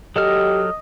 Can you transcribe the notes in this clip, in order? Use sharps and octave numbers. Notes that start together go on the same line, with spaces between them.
F#3 G4 A4 D#5 F6